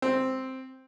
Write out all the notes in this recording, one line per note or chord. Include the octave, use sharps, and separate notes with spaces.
C4